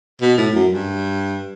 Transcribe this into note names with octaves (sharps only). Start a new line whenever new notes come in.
B2
A2
F#2
G2